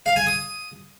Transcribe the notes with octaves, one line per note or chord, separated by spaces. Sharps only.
F5
G#5
D#6